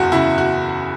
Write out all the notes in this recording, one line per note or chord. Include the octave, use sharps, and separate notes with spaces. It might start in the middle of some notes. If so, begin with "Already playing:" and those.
Already playing: F#1 E2 F#4
C#3 E4
F#4